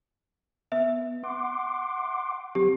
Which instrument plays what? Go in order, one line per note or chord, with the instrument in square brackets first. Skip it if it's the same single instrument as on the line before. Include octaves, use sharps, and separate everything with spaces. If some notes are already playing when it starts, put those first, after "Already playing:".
[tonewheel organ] B3 [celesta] E5
[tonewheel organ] F#5 C6 D6
[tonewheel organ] F#3 C4 [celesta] G4